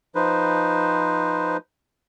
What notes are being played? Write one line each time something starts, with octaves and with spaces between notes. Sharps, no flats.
F3 D#4 B4 C5